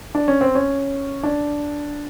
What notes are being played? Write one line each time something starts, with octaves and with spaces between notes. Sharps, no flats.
D4
C#4
C4
C#4
D4